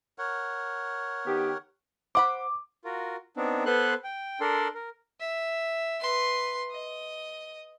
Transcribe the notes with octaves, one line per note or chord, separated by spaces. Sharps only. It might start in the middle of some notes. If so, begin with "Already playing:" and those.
A#4 C#5 F#5
D#3 B3 G4
C5 F#5 B5 D6
F4 F#4 A#4
B3 C4 D4 D#4
B3 A4 B4 C5 C6 F#6
G5
D4 A4 A#4 D5 C6
A#4
E5
B4 C6
D#5